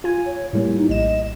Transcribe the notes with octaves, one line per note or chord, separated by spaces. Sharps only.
F4 G#5
C#5
A2 G3 A#3 E4
D#4
A#1 D#5 E7